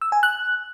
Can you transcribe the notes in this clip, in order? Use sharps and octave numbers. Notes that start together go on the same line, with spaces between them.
E6
G#5
F#6